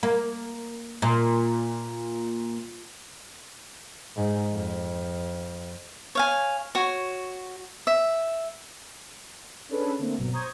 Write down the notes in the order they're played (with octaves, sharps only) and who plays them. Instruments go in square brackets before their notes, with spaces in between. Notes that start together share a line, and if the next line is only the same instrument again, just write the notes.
[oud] A#3
A#2
[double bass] G#2
F2
[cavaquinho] C#5 F5 G#5
F#4 C#5
E5
[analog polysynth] C#4 D4 G#4 A4 B4
D3 A3 A#3 C4
G1 B2 F#3
C5 A#5 C#6 D#6 G6 G#6